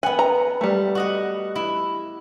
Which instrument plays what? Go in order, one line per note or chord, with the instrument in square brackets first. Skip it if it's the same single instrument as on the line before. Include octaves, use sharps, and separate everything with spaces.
[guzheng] B3 F#5 [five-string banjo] G#5
[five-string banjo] A#5
G3 A3
[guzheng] F#4 D#5 F#5
E4